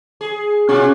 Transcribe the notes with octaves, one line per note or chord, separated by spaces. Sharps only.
G#4
B2 C#4 F4 F#4